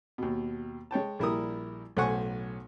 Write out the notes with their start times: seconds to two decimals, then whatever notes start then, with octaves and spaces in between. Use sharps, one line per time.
0.18 D#2 B2
0.91 G#3 C#5 G5 A5
1.19 A#1 G3 E4 G4 A#4 D#6
1.97 B1 A2 C5 F#5 G#5 C#6